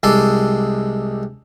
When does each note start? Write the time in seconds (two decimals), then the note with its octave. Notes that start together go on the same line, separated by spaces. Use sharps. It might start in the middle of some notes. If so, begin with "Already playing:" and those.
0.03 C2 G#3 A4 C6 D6